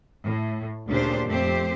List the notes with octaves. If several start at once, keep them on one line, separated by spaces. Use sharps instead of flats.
A2
D2 A#2 C#3 D4 G4 C5
F2 A3 C4 G4 C5